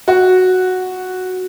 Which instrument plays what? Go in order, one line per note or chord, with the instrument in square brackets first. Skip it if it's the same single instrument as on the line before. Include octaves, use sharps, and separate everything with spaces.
[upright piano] F#4